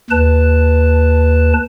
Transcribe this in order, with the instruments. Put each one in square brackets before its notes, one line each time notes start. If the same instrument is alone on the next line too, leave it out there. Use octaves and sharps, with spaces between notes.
[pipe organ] D#2 B4 A5